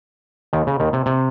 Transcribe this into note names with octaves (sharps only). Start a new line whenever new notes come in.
D#2 D#3
C#3
D#2 D#3
C3
C3